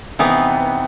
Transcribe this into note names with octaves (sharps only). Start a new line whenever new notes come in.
C3 E3 B3 D#4